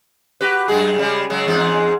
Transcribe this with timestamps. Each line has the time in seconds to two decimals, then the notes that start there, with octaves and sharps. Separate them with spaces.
0.41 F#4 G4 B4
0.68 F#2 G#3 G#4
0.98 C#3 G3 G#3
1.30 C#3 F#3 G#3
1.47 E2 G#2 G#3